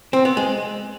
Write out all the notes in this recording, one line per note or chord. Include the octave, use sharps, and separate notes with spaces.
C4
B3
G#3